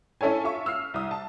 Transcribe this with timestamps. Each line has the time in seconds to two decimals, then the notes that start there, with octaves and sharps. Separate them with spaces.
0.21 C#4 E4 A4 C#5 G#5
0.44 F4 E5 C#6
0.66 E6 F6 C7
0.94 C2 D#6
1.11 A5